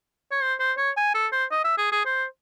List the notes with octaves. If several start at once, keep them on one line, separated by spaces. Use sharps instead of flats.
C#5
C5
C5
C#5
G#5
A4
C5
D#5
E5
G#4
G#4
C5